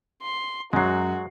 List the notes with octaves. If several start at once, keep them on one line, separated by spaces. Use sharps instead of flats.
C6
F#2 F#3 G#3 F#4 C7